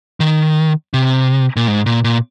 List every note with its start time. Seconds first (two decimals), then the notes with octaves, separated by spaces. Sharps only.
0.20 D#3
0.94 C3
1.56 A#2
1.68 G#2
1.86 A#2
2.04 A#2